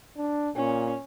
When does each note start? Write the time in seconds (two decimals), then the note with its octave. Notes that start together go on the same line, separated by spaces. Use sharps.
0.17 D4
0.56 A#2 C#4